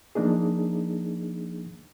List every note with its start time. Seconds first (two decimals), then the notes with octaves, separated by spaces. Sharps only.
0.15 F3 A#3 D4 D#4 G#4